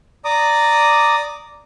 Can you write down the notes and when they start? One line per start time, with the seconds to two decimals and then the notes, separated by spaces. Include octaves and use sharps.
0.25 D5 A#5 D6 D#6